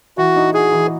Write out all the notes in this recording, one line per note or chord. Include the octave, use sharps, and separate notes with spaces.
E3 F#4
D#4
F#4 G#4
E3